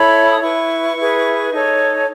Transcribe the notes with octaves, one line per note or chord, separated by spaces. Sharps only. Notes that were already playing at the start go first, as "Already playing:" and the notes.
Already playing: E4 A4 C#5 B5
D#6
E4 B4 C#6
E4 G#4 B4
D#4 A4 C#5